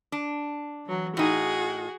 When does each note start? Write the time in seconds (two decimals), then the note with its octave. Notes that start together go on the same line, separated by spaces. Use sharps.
0.12 D4
0.85 E3 F#3
1.17 A2 D#4 F#4 G#4